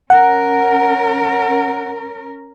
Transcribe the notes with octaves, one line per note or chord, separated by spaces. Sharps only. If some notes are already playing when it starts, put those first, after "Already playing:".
C#4 A#4 F#5